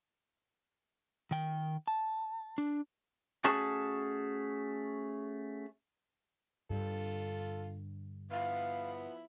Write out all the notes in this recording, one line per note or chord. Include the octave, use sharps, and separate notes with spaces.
D#3 G5
A5
D4
A3 C#4 F#4 G#4 A5
G2 D3 F4 A4
F3 B3 E4 F5